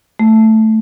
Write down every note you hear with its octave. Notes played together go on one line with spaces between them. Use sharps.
A3